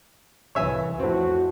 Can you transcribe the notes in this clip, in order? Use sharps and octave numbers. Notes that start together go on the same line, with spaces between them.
C2 E3 C#5 E5 G#5
F2 A2 C4 F#4